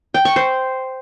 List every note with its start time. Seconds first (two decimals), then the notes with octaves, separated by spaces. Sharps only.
0.14 G5
0.25 C#6
0.36 C5